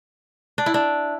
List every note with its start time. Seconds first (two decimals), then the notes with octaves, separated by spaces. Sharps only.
0.58 D4
0.66 E4
0.74 D4